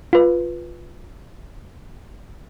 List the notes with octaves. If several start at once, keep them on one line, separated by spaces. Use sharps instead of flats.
F4 B4